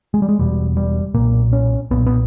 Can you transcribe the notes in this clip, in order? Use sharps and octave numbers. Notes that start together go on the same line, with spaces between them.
G#3
G3
G#3
E1 E2 B2 G3
G3
B1 A#2 A#3
C#4
B1 A#2 B3
B3